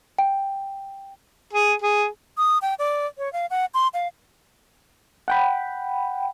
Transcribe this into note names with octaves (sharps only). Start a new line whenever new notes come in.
G5
G#4
G#4
D#6
G5
D5
C#5
F5
F#5
C6
F5
F#5 G5 B5